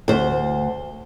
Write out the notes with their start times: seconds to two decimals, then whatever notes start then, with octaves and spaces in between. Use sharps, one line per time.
0.08 D2 C5